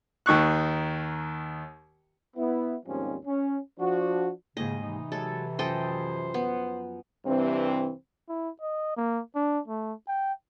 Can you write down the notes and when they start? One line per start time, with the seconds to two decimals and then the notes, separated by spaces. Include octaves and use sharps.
0.26 D#2 D#3 C#6 F#6
2.36 B3 E4
2.86 D#2 G#2 F3 G3 C4 C#4
3.25 C#4
3.79 F3 D4 F#4
4.57 D#2 G#2 C#3 D#5
4.83 C3 E3 D#4
5.12 F#3 G#3 A4
5.59 F#2 F3 A4 C5 D#5 G5
6.34 B3
7.26 G2 C3 E3 C4
8.29 E4
8.62 D#5
8.97 A#3
9.35 D4
9.68 A3
10.08 G5